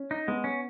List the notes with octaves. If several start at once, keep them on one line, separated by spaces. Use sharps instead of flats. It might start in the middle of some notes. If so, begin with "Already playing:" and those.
Already playing: C#4
D#4
G#3 B3
C#4